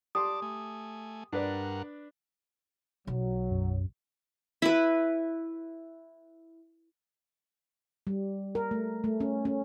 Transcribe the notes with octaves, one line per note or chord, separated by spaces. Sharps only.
G4 D5 A5 C6 D#6
A3 G#5
G2 D4 A#4 B4 D5 F#5
B1 F#3
F#2
E4 B4
G3
A#4
A3
A3
C#4
C#4